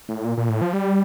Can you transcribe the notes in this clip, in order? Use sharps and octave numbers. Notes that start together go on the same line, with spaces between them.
A2
A#2
A#2
A2
F3
G3